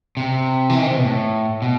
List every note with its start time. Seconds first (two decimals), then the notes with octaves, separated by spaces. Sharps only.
0.17 C3
0.70 E3
0.79 D#3
0.87 C3
0.96 B2
1.05 A2
1.62 B2